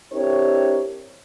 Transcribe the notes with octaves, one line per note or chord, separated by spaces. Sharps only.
C4 D4 E4 G4 A#4 C#5